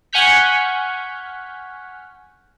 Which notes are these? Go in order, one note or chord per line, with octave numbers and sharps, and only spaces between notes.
F#5 G#5 C#6 F6 G6 B6